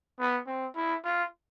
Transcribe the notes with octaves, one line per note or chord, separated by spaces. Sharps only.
B3
C4
E4
F4